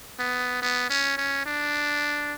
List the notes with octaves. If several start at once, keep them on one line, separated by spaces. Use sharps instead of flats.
B3
B3
C#4
C#4
D4